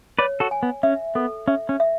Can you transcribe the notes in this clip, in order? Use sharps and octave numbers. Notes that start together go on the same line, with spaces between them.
B4 C#5 D5
F#4 A4
G#5
B3
C#4 E5
B3 A4
C#4 E5
C#4
E5